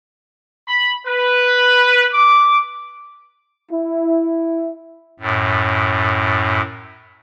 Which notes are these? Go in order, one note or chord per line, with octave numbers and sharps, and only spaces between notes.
B5
B4
D6
E4
F#2 A2